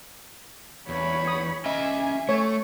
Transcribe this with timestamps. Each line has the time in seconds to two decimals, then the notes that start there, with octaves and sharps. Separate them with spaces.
0.89 E2 C#5 B5
1.27 D#6
1.66 C#4 D#5 E5 G#5
2.29 A3 C#5